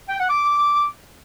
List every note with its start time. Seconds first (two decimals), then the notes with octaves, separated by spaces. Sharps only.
0.09 G5
0.19 F#5
0.29 D6